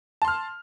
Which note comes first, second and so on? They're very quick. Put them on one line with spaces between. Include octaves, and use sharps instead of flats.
A5 C6 F6